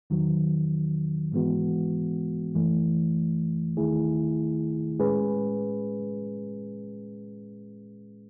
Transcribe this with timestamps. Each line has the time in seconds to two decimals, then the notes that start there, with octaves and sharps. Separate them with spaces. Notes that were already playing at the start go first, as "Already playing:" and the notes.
0.10 E2 D#3 F#3
1.32 G#2 E3 G#3 B3 F#4
2.55 F#2 E3 A3
3.77 D#2 D#3 A3 E4 G#4
5.00 A2 G#3 C#4 G#4 B4